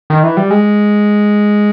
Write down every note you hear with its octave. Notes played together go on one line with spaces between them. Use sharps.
D#3
E3
G3
G#3